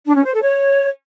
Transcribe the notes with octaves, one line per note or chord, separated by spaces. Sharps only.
D4
C#4
C5
A4
C#5